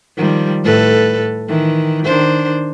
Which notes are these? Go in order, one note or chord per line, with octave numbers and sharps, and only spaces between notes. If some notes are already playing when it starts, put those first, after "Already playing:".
D#3 F3 G3
A2 A4 B4
D#3 E3
D#3 D4 C5